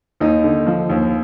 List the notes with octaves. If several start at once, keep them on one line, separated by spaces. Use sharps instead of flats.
D#2 D#4
D3
F3
D#2